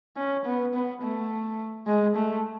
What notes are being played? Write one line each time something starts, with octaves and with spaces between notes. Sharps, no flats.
C#4
B3
B3
A3
G#3
A3